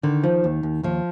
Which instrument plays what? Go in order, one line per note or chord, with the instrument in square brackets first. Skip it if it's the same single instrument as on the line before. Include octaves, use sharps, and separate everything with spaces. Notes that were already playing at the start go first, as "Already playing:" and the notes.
[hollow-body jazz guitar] D3 [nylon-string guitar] D#3
[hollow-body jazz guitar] F3
D#2
D#2
[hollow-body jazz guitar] D#2 [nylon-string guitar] F3